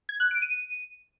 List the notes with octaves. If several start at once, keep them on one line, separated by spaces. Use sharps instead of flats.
G#6
F#6
D7
D#7